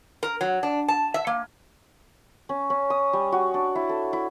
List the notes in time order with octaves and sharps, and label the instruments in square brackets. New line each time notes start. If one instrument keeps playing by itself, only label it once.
[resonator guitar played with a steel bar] A#4
F#3
D4
A5
E5
A#3
[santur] C#4
C#4
D#6
G3
F#4
D4
E4
A4
E4